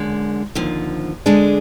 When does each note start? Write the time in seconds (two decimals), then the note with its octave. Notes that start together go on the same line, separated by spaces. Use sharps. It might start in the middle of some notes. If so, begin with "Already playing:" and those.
Already playing: F#2 D3 G#3
0.55 D#2 D3 F3
1.26 D3 G#3 D4 G#4